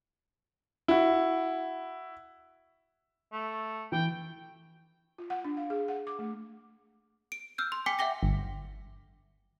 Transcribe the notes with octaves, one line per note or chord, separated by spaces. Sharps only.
E4 F#4
A3
E3 G5
F4
F#5
D4
F5
G#4
F#5
D6
A3
D7
E6 F6 G6
C6
G5 G#5 D6 B6 C#7
E5 F#5 G5 D6 A#6
G1